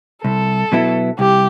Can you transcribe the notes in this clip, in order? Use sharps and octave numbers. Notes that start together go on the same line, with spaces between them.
C2 A4
B2 F#3 B3 E4
C2 G4